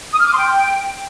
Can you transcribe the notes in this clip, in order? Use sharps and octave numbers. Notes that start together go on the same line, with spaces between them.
D#6
F6
D6
C6
G5